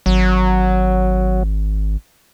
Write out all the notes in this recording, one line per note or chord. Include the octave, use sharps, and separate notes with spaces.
G#1 F#3